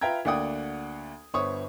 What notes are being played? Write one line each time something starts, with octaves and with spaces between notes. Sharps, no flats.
F4 B4 E5 G5 A#5 G#6
D2 A#3 D5 F#5 G5 D#6
G1 B3 C5 C#5 C#6 D#6